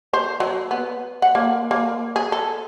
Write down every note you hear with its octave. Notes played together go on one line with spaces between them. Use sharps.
C5
F#3
B3
F#5
A#3
A#3
G#4
A4